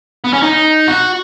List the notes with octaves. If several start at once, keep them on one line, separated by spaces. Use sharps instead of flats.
B3
C#4
D#4
F#4